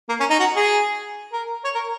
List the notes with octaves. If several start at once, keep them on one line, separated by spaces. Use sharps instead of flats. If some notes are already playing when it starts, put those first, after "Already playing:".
A#3
C#4
D#4
F#4
G#4
A#4
C#5
A#4